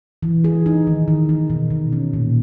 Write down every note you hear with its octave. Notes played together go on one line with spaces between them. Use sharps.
E3
G#4
D#4
D#3
D#3
D#4
B2
B2
C#4
A#2